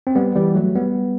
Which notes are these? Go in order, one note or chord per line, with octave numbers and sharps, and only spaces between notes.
C4
G3 B3
E3 G3
F#3 A3
G3 B3